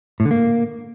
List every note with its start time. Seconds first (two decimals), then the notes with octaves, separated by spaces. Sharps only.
0.20 A2
0.25 D3
0.31 A#3